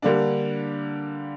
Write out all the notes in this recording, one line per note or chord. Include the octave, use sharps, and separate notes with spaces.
D3 G3 A#3 D4